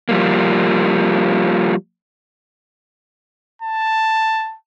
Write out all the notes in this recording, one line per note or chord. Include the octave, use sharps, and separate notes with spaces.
F3 G3 A#3
A5